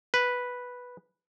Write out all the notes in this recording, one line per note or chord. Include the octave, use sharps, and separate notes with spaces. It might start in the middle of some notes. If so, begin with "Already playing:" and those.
B4